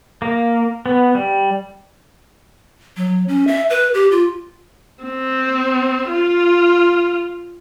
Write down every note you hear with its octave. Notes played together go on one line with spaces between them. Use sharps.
A#3
B3
G3
F#3
C#4
E5
B4
G4
F4
C4
F4